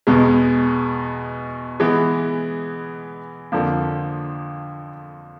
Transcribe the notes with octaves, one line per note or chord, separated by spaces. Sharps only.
E2 B2 G#3
E3 G#3 B3
F2 D3 F3 A#3